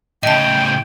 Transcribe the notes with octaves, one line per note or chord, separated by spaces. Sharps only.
A2 C#3 D#5 G5 A5